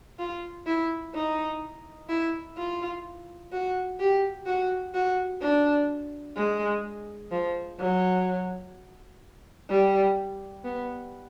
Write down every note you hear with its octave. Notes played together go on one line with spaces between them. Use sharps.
F4
E4
D#4
E4
F4
F#4
G4
F#4
F#4
D4
G#3
F3
F#3
G3
B3